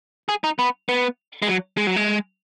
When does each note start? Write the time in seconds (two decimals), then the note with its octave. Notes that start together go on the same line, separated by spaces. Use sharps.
0.29 G#4
0.44 D#4
0.59 B3
0.89 B3
1.42 G#3
1.48 F#3
1.77 G#3
1.87 F#3
1.96 G#3